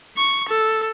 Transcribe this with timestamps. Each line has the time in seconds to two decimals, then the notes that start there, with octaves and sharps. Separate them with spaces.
0.17 C#6
0.49 A4